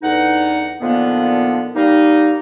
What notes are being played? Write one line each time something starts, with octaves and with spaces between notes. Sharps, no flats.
E2 D3 D#4 F#5
A#2 D3 D#3 F3 A#3 B3
G3 A#3 D#4